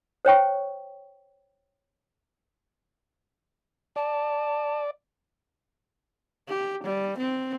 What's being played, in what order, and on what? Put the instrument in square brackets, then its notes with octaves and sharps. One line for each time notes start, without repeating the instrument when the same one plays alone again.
[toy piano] C5 C#5 G5 C#6
[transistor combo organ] D5 [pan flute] A5
[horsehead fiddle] G4
G3
C4